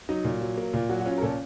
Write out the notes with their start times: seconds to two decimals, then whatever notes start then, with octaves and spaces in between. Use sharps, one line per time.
0.09 F#3 D#4
0.24 A#2
0.41 F#3
0.57 A#3
0.73 A#2 F4
0.89 F#3 F#4
1.00 F#4
1.06 C#4 F4
1.18 A#4
1.22 A#2 A4